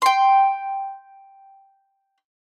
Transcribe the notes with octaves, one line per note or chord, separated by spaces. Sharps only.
G5 C6